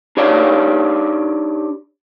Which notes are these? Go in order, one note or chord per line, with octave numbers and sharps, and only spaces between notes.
D4 D#4 G4 C#5 D5 F5